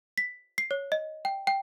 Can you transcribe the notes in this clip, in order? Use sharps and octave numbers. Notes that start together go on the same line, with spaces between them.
B6
C7
C#5
D#5
G5
G5